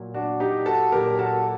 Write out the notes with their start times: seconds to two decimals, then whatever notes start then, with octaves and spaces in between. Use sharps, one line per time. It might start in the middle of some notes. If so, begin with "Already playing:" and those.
Already playing: A#2 F#3
0.14 D4 F#4
0.40 D#4 G4
0.66 F#4 A4
0.92 A#2 F#3 G4 A#4
1.19 F#4 A4